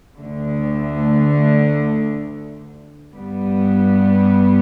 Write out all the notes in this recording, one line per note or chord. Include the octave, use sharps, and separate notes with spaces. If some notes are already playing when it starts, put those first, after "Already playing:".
D2 D3 A3
G2 G3 B3